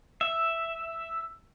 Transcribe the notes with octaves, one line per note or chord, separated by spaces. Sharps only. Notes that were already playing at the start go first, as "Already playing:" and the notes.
E5